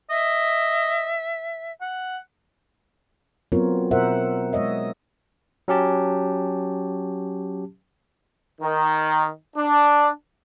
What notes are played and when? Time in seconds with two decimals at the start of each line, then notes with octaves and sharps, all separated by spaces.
0.10 D#5 E5
1.81 F#5
3.52 F#3 B3 C4 F4 A#4 C#5
3.91 B2 A#4 C5 E5 F#5
4.53 G#3 C#5 D#5 E5
5.68 F#3 C#4 G4 A5
8.61 D#3
9.56 D4